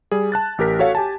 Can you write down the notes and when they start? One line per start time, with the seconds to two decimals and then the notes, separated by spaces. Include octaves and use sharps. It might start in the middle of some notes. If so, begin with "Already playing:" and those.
0.11 G3 G#4
0.32 A5 F#6 A6
0.58 A1 G4 A#4 B6
0.79 F#4 A4 C#5 F5 F#5
0.95 G4 G#5 A5